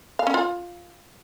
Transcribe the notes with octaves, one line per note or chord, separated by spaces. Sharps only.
F5
C#4
F4